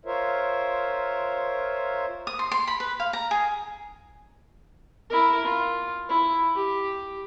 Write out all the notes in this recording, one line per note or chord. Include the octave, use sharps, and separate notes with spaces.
F4 A#4 C5 C#5 E5
D#6
C6
C6
B5
B4
F5
A#5
G#4
E4 A#4
F4
E4
G4